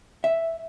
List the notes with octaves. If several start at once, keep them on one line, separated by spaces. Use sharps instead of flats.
E5